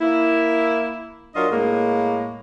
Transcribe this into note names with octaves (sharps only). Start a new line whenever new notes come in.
A#3 E4
F#3 D4 F4 A#4 D#5
A2 G#3 A#3